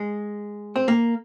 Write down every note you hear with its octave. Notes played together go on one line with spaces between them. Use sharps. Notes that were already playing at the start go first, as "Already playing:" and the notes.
Already playing: G#3
C4
A#3